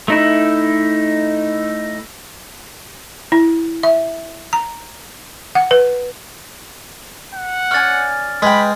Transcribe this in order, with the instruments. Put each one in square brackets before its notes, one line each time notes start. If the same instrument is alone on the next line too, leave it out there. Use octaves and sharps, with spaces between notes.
[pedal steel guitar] A3 D#4 E4
[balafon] E4
E5
A#5
F#5
B4
[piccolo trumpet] F#5
[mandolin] C#4 D5 G#5 [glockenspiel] F6 A6
[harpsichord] G#3 [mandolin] B4 G5 [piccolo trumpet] B5